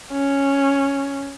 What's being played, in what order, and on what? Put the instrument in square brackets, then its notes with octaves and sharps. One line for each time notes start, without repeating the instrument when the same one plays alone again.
[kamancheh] C#4